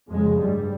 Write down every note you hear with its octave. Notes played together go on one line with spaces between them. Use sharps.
F2 C#3 G#3
G2 G3